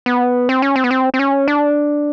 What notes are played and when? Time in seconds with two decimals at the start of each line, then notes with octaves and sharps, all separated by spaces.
0.06 B3
0.49 C4
0.62 C#4
0.76 C4
0.84 B3
0.91 C4
1.14 C4
1.19 C#4
1.48 D4